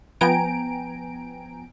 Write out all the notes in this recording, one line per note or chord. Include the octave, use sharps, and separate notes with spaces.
F3 B3 G5 G#5 A#5 D7